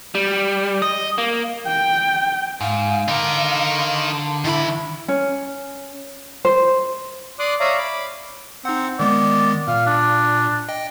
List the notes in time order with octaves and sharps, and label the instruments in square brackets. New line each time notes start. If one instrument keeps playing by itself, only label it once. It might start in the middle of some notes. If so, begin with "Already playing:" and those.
[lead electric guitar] G3
D#5
A#3
[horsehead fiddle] G5
[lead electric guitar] G#2 [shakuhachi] F5
[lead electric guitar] D3 [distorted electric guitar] D#4 A#4
[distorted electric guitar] D#3 B5 [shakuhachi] E4
[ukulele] C#4
C5
[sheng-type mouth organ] D5 C6 D6 D#6 F#6
C#5 D5 E5 F5 A#5 D#6
B5 D6
[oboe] C4 [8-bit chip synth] D#4 F#5
[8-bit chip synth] D#3 G#3 B3 [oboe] D5
[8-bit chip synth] A#2 [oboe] F5
[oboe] D4
[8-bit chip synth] D#5 G5